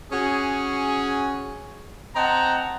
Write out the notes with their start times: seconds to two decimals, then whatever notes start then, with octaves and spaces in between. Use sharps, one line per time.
0.12 C#4 F#4 G#4
2.15 C4 D#5 F#5 A5 A#5